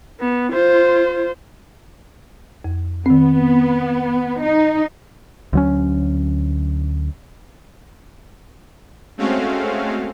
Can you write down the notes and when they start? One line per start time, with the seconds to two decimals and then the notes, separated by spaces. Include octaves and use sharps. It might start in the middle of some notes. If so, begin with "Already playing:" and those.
0.20 B3
0.53 F4 C5
2.64 F2
3.06 D#3 B3 C4
4.43 D#4
5.53 D2 F#3 C#4
9.17 G#3 A3 C4 C#4 F#4 F5